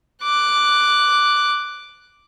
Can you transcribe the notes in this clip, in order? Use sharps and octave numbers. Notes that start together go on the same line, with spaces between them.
D6 F#6